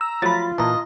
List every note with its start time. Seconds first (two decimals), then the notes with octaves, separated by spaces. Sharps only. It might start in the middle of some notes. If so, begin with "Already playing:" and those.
0.01 A#5 E6
0.22 F3 F#3 A3 F4 B5 A6
0.58 A#2 E3 D#5 A5 A#5